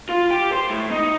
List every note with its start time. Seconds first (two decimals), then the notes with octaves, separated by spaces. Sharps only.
0.09 F4
0.30 G4
0.52 C5
0.70 A2
0.91 D#4